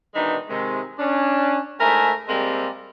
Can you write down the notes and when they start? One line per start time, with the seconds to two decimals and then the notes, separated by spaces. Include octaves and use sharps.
0.15 B2 D#3 E3 G#3 D4 D#4
0.49 C3 D#3 G#3
0.99 C#4 D4
1.80 G#2 A3 E4 A#4 E5 G#5
2.29 C3 G3 G#3 A#3 C4